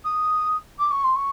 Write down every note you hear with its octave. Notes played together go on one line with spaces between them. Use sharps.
D#6
D6
C#6
C6
C#6